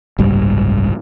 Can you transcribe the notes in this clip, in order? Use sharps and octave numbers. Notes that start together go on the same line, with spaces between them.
F#1 C2 G#2 G3